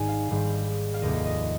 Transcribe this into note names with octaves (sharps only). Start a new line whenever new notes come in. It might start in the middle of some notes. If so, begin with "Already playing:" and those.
Already playing: G#1 G#2 G3 G#5
F5
G#1 G#2 G3
F5
F1 D#2 D#3 D#5
D#5